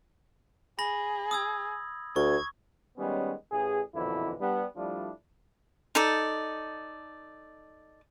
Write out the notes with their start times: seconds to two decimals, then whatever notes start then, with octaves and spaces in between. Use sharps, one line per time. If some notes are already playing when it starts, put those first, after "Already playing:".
0.79 G#4 B5 A#6 F#7
1.31 D#6 E6 G#6
2.16 D2 C#6 G#6
2.98 D#3 G3 G#3 B3 C#4
3.52 A1 G#4
3.95 A#1 F2 B2 D3 E3 E4
4.41 G3 B3 D4
4.77 F3 G3 A3 D4 E4 F4
5.95 D#4 A4 D5